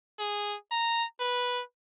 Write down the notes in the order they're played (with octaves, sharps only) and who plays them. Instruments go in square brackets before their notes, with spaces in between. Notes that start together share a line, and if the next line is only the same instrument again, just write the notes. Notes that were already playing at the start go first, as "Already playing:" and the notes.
[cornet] G#4
A#5
B4